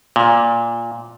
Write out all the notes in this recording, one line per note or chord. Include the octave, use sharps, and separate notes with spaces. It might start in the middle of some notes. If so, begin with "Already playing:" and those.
A#2